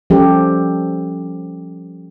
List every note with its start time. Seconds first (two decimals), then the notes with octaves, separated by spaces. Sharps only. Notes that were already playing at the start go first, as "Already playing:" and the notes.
0.10 F3 G3 C#4 F4 G4 A4